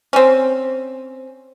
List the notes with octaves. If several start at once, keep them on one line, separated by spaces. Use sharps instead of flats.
C4 C#4